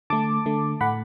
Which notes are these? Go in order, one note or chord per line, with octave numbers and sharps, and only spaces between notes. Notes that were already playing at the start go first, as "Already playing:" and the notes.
D3 A3 A5 D6
D3 A3
A2 A3 F#5 B5